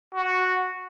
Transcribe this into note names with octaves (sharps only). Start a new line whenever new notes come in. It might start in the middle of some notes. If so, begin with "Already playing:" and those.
F#4